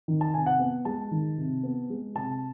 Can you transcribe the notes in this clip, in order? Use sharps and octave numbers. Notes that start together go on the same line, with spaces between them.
D#3
A5
C3 G#5
F#5
B3
G#3 A5
D#3
C3
B3
G#3
C3 A5